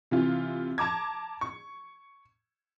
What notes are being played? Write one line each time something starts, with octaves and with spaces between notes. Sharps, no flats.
C3 E3 F4
A5 A#5 D6 G#6
C#6